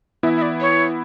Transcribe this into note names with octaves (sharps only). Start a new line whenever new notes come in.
E3 B3 E4 E5
E5
D5
C#5